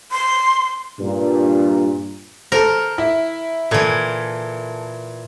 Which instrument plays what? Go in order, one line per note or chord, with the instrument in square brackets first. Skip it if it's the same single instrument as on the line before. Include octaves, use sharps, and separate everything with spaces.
[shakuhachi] C6
[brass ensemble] G2 A#2
[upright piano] A4 C5 [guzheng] A#4
[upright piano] E4
[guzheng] A#2 E3 [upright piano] A4 G#6